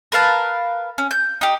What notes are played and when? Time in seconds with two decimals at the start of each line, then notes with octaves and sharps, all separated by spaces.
0.12 A#4 B4 F5 A5
0.98 C#4
1.11 G6
1.41 D#4 G4